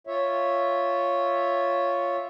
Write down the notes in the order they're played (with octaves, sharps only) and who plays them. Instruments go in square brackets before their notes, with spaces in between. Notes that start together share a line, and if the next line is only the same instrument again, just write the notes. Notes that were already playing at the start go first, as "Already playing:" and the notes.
[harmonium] F4 C#5 E5